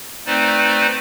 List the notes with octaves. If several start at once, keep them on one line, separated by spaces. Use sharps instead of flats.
A3 C4 D#4 B4 C5 D5